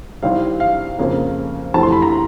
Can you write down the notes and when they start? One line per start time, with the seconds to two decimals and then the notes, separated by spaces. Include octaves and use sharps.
0.23 C3 D#3 G3 C4 E4 F5
0.60 F5
0.99 F2 C#3 F3 A#3
1.74 F2 C3 E3 A3 A5
1.83 C6
1.92 B5
2.02 A#5